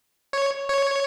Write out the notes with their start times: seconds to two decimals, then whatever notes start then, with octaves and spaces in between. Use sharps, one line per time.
0.33 C#5
0.69 C#5